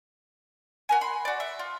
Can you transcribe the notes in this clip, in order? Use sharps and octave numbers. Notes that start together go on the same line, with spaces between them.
F#4 A#4 G#5
B5 C6
F#4 D5
E5
F4